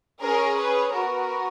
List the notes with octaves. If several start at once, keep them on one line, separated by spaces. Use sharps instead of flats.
C#4 G#4 A#4
B4
B3 F#4 A#4